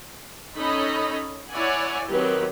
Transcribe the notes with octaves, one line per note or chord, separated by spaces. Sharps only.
C#4 D#4 A4 C#5 D#5 B5
E4 C#5 D5 F#5 G#5
D#3 F#3 C4 G4 B4